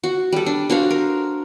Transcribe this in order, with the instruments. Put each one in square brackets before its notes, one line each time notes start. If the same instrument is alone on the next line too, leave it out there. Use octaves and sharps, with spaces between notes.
[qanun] F#4
G3 A4
D4
D4 F#4 C5 F5
A#4